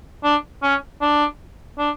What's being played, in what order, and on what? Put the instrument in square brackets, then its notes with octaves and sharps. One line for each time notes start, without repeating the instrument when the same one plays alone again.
[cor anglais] D4
C#4
D4
D4